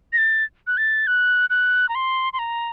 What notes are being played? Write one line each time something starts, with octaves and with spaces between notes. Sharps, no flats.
A#6
A6
F#6
A6
F#6
F#6
A#5
C6
C6
A#5